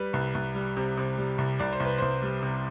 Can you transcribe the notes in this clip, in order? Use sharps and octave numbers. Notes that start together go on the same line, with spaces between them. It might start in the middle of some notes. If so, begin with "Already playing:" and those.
Already playing: G3 B4
C2
C2
G3
C3
C3
G3
C2
C2 D5
C5
C2 B4
C2 C5
G3
C3